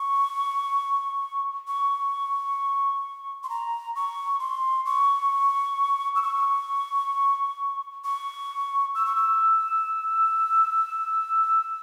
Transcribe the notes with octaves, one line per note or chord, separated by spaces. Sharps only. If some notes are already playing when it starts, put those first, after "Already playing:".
Already playing: C#6
C#6
C6
A#5
C#6
C6
C#6
E6
C#6
C#6
E6
C#6
E6